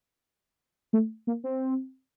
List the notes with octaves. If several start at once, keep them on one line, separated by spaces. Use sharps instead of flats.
A3
A#3
C4